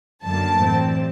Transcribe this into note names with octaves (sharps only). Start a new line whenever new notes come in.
F#2 D3 F#3 A#3 A5
A2 E3 G3 C4